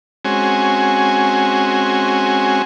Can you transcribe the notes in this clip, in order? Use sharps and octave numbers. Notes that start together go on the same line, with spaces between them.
G#3 C4 C#4 F#4 G#5